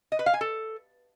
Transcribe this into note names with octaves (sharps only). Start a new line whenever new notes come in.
D#5
B4
F5
G#5
A4